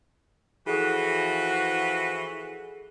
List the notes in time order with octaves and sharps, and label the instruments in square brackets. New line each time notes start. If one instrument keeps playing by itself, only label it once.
[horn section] E3 F3 F#4 [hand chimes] G#4 A4